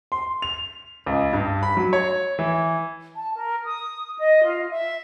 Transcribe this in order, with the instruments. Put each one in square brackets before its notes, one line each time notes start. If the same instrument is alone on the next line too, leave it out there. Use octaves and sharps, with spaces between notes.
[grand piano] C6
F7
C#2
G2
B5
F#3
C#5
E3
[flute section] A5
A#4
D#6
D#5
F4
E5